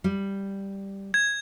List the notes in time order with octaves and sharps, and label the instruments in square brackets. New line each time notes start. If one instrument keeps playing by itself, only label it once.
[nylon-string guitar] G3
[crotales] G#6